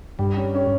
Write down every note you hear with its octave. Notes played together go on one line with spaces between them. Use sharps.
G2 G3
C#4
C#4